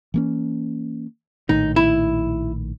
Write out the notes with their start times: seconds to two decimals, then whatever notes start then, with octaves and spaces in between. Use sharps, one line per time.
0.14 E3 A#3 C#4
1.49 A#1 A2 D#3 D#4
1.76 E4